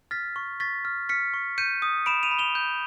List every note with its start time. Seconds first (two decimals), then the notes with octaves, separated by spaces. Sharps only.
0.11 F6 A6 B6
0.36 C#6
0.60 C#6 A6 B6
0.85 F6
1.09 F6 B6 C#7
1.34 C#6
1.58 G6 C#7 D#7
1.82 D#6
2.06 B5 D7 E7
2.23 D#7 F7
2.31 B5
2.39 F7 G7
2.55 G6